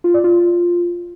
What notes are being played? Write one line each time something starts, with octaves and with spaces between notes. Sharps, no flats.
F4
D5
F4